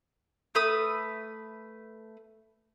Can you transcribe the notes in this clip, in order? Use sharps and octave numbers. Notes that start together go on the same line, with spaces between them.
A3 B4 D#6